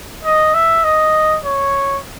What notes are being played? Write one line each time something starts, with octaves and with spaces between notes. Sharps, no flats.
D#5
E5
D#5
C#5